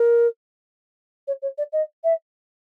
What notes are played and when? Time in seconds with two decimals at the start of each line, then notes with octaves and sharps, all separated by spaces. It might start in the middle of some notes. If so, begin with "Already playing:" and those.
Already playing: A#4
1.27 C#5
1.42 C#5
1.57 D5
1.72 D#5
2.03 E5